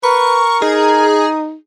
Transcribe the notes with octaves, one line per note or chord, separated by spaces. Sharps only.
A#4 B4 C#6
D#4 G#4